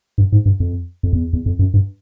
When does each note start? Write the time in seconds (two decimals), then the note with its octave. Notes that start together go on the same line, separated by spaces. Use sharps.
0.18 G2
0.32 G#2
0.46 G2
0.60 F2
1.03 F2
1.13 E2
1.33 E2
1.46 F2
1.59 F#2
1.74 G2